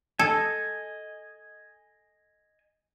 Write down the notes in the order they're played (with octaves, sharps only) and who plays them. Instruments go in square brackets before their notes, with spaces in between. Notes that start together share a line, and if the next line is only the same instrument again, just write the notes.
[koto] A4 [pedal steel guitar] D#5 G#5